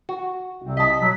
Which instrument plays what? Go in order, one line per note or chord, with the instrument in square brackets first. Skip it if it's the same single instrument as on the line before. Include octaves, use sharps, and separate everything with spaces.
[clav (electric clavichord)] F#4
[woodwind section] C2 C3 C4
[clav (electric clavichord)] D#5 A5 [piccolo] B6
[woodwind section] B2 F#3